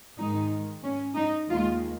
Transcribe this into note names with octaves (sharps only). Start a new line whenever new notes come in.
G#2 D#3 G#3 D#4
C#4
D#4
D#2 D#3 G#3 F4